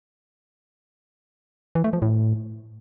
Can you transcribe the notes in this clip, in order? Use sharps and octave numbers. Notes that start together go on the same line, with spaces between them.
E3
A3
F3
A2